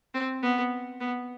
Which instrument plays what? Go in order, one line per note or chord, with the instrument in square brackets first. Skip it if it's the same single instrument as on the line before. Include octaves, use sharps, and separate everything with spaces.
[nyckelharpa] C4
B3
B3